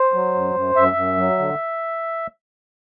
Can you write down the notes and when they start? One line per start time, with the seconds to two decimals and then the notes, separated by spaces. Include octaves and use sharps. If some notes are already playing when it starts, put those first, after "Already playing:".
Already playing: C5
0.13 F#3
0.34 F#2
0.55 F#2
0.75 F#2 E5
0.96 F#2
1.17 F#3
1.39 D3